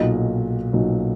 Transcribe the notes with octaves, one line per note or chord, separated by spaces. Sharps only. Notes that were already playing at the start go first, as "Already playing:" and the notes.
Already playing: B1 A#2 F#3 D#5
B1 A#2 F#3